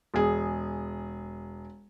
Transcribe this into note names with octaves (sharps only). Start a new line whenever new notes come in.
E1 G#4